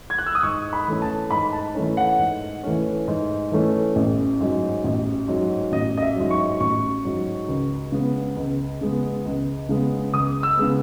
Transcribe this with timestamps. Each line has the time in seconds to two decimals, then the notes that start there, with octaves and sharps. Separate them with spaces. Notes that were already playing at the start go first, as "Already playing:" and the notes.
0.10 G#6
0.18 F#6
0.26 E6
0.35 D#6
0.43 G#2 C#6
0.73 B5
0.87 E3 A3 C#4
1.02 A5
1.31 G#2 B5
1.53 A5
1.75 E3 A3 C#4
1.97 F#5
2.19 G#2
2.63 E3 A3 C#4
3.08 G#2
3.52 E3 A3 C#4
3.96 A1
4.41 G#2 F#3
4.84 A1
5.28 G#2 F#3
5.72 A1 D#5
5.97 D#5
6.02 E5
6.16 G#2 F#3
6.31 C#6
6.60 A1 C#6
7.05 G#2 F#3
7.48 C#2
7.92 C#3 G#3 B3
8.36 C#2
8.81 C#3 G#3 B3
9.25 C#2
9.69 C#3 G#3 B3
10.14 C#2 D#6
10.43 E6
10.57 C#3 G#3 B3